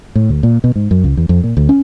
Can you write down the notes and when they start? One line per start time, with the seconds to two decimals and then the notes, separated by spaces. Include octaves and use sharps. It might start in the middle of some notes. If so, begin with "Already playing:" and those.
0.15 A2
0.29 D2
0.43 A#2
0.64 B2
0.76 G#2
0.91 F#2
1.04 C#2
1.17 E2
1.29 F2
1.44 A#2
1.57 D2
1.69 C#4